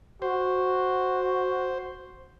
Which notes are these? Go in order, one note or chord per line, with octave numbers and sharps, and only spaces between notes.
F#4 C5